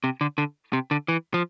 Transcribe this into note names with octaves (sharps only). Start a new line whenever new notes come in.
C3
D3
D3
C3
D3
E3
F3